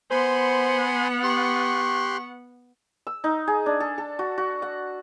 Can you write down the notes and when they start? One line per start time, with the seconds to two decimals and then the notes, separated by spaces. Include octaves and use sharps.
0.11 B3 C5 F#5 G#5 B5 C6
1.23 G4 C6 C#6 F#6
3.07 E6
3.24 D#4
3.47 G#4
3.66 D4
3.80 A4
3.98 A4
4.19 F#4
4.38 F#4
4.62 F#5